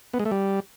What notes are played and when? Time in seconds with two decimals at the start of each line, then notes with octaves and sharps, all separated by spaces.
0.14 B3
0.19 G#3
0.25 A3
0.31 G3